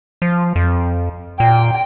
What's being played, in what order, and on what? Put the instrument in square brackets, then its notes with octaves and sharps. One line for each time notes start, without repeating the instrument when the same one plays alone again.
[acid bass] F3
F2
[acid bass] A#2 [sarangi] G5